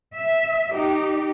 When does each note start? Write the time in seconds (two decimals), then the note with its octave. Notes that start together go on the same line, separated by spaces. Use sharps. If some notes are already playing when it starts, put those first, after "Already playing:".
0.15 E5
0.74 D#4 G4